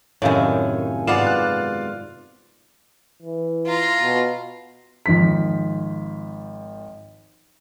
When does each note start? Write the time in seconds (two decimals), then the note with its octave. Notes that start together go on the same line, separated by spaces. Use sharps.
0.22 F#2 A2 C3 D#3 C#5 D5 F5 G#5
1.07 G#2 B3 F4 D5 F5 F#5 E7
1.27 F#6
3.23 E3
3.66 F4 A#5
4.03 B2
5.06 G#1 F3 B6